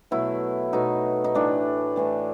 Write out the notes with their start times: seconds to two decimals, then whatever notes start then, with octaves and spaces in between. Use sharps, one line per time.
0.11 B2 F#3 A3 E4
0.73 B2 F#3 A3 D#4
1.24 D#4
1.34 A2 E3 A3 D4
1.96 A2 E3 A3